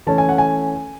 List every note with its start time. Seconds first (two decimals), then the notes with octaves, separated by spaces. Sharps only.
0.07 E3 A3 C#4 A5
0.18 G#5
0.29 F#5
0.38 G#5